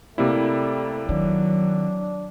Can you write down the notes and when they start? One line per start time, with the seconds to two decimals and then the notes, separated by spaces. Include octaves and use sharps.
0.18 C3 G3 A3 A#3 E4
1.09 D#3 F#3 D4